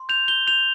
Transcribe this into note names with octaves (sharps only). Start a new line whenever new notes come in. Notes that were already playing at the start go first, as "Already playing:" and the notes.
Already playing: C6
G6 F7
G6 G7
G6 F7